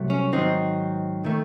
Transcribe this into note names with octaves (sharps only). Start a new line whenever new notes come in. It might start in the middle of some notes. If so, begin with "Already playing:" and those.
Already playing: C2 C3 F#3 A3
C#4
G#2 D#3 F#3 C4 D#4
D#3 A3